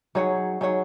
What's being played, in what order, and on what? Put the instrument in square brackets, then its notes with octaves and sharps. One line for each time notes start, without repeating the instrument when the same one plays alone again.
[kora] F#3 [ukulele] D#4 G#4 C#5 F#5
[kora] F#3 [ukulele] D#4 G#4 C#5 F#5